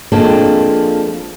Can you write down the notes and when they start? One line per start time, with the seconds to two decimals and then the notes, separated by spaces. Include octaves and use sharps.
0.12 F3 G#3 A#3 C4 D4 A4